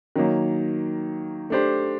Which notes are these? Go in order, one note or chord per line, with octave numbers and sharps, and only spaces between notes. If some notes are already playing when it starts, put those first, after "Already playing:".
D#3 F#3 A#3
A3 D4 G4 C5